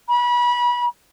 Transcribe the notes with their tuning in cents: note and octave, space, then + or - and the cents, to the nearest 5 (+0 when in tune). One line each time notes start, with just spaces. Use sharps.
B5 -30